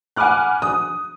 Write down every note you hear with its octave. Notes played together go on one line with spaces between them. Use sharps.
F#5 G#5 B5 D6 F6 F#6
D#6